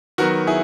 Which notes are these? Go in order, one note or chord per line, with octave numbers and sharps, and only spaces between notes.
D#3 F#3 B3 F#4 A#4
E4 G#4